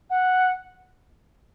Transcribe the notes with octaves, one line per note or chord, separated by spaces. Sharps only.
F#5